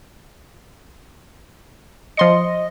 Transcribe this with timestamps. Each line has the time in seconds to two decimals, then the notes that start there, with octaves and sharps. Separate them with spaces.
2.17 F3 D#5 C6 C#7